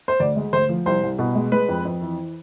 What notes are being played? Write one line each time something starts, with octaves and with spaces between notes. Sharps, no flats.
C5
D2 D5
G#3
D2 C5
F3
C2 C5
C2
B2
G#3
G#3 B4
F2
F2
E3